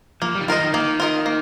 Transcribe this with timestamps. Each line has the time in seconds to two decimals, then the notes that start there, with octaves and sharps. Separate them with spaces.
0.22 F3 A#3
0.35 G3
0.41 D#3
0.47 F3 F4 A#4 D#5
0.61 D#3
0.73 D#3 A#3
1.00 F4 A#4 D#5
1.26 A#3